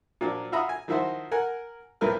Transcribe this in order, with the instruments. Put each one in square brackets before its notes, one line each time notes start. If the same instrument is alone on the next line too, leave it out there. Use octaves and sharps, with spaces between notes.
[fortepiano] A#2 F3 F#3 D4
F4 F#4 E5 A#5 B5 D#6
G#5
D#3 F3 E4 F#4 C5
A#4 F#5 G#5
C2 A2 F3 A#4 B4 F6